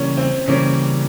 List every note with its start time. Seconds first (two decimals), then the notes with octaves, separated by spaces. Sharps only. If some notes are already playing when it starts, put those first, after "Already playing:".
Already playing: C#3 E3 G3 A#3 C#4
0.17 C4
0.48 C#3 E3 G3 A#3 C#4